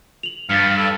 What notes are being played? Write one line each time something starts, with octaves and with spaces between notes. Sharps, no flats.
F7 F#7
G2 F5 A6 B6 C#7
A4